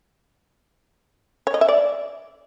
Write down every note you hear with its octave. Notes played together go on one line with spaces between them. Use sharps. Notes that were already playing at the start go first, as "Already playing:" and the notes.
C#5
D#5
E5
D5